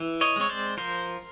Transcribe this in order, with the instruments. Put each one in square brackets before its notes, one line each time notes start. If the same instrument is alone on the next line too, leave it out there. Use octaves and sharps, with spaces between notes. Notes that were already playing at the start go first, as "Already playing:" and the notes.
Already playing: [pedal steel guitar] E3
C#5 D#5
G#3 C4 C#5
C5 D5
F3 A#4 C5